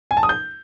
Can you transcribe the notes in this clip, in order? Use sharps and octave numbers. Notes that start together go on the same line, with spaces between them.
G#5
A5
D#6
G6